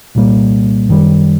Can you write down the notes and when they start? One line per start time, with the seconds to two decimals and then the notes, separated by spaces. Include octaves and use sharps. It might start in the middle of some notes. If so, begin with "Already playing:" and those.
0.15 C2 A#2 G3 A#3
0.89 F#2 D#3 G3